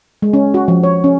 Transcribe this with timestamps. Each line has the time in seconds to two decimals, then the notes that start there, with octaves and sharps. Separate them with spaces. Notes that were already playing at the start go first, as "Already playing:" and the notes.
0.22 G#3
0.33 C#4
0.54 F#4
0.68 F3
0.83 C#5
1.04 C#4